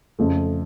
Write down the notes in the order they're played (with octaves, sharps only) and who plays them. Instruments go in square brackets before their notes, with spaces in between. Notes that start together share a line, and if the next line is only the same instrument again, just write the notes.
[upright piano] F2 C#3 A3